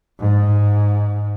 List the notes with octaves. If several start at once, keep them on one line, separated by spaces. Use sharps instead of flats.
G#2